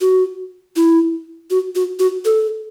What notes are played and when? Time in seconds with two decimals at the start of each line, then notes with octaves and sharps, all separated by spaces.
0.01 F#4
0.76 E4
1.51 F#4
1.75 F#4
1.99 F#4
2.25 A4